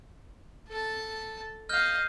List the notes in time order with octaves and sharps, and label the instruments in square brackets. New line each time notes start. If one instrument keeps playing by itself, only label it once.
[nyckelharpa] A4 A5
[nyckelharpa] D#5 F5 [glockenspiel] F6 G6